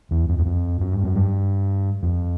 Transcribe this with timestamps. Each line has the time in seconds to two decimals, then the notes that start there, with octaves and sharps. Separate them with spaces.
0.11 E2
0.29 F2
0.38 E2
0.46 F2
0.80 F#2
0.92 G2
1.04 F#2
1.15 G2
2.03 F2